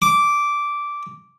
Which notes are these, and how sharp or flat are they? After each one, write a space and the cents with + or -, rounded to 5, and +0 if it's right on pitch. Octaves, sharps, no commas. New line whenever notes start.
D6 -10